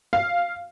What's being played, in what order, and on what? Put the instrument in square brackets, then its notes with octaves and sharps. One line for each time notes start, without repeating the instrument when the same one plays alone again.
[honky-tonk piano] F5